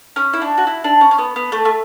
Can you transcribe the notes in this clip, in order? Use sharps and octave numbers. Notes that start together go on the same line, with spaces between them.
C#4
E4
D4
F#4
E4
D4
C#4
C#4
B3
B3
A3
A3